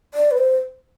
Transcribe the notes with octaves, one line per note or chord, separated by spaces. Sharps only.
D5
B4
C5